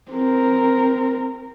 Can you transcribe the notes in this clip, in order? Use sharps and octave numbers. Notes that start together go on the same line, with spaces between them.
C4 A#4